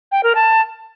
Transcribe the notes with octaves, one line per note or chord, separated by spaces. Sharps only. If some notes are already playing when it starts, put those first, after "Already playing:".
G5
A#4
A5